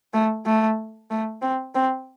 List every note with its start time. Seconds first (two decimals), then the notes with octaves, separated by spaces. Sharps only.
0.14 A3
0.46 A3
1.11 A3
1.42 C4
1.75 C4